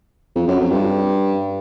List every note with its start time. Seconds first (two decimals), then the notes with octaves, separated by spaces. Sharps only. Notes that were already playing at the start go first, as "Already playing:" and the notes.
0.35 F2
0.47 F#2
0.60 F2
0.70 G2